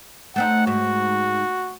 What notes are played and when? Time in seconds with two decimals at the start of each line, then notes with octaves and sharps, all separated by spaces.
0.36 A3 C4 D#4 F#5
0.67 G#2 F#4